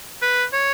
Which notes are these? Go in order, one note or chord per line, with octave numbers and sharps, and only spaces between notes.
B4
C#5